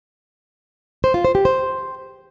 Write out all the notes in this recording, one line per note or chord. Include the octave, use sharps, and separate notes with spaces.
C5
F4
C5
G4
C5